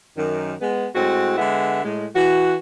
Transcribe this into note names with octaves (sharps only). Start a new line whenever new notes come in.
F#2 D#3
G#3 B3
A2 G#3 C4 F#4
D3 G#3 B3 E5 F#5
A2 G#3
E3 F#4